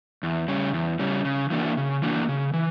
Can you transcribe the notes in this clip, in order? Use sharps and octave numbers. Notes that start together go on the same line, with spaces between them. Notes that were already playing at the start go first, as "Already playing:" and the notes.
E2
C#3 G3 C#4
E2
C#3 G3 C#4
C#3
E3 A#3 D4 F#4
C#3
E3 A#3 D4 F#4
C#3
E3